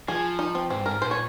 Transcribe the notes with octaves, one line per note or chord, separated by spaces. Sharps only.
F3 G#4
D#4
C4
G#2 C4
G2
A#4
G#2
A#2 C5
C#5